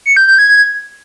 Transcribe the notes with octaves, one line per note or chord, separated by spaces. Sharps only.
C#7
G6
G6
G#6